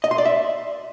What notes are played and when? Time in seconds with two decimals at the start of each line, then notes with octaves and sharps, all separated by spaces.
0.04 D#5
0.11 C6
0.18 D5
0.25 E5